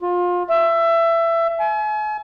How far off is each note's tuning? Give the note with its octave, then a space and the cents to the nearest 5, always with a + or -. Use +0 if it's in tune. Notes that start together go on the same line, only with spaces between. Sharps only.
F4 +25
E5 +20
G#5 +40